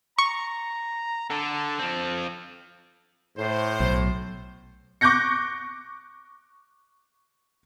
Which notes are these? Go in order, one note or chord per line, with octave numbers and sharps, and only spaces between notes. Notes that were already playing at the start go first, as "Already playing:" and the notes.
A#5 C#6
D3 A4
F3 C4
A2 C5
B1
C#6 D6 F#6 G6 A#6 C#7